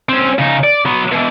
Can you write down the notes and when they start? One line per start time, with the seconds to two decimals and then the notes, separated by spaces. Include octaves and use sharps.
0.09 C4 C#4
0.39 C#3 D#4
0.64 D5
0.86 F#3 B3
1.12 B2 E3